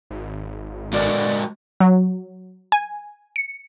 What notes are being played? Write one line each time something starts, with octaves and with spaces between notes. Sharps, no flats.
G#1
D3 G#3 B3 F#4 A#4 D5
F#3
G#5
C#7